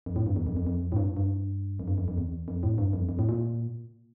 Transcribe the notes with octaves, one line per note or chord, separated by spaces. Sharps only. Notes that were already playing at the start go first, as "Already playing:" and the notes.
F2
A2
G2
E2
F2
F2
F2
A2
G2
G2
F2
G2
F2
F2
E2
F2
A2
G2
F2
F2
A2
A#2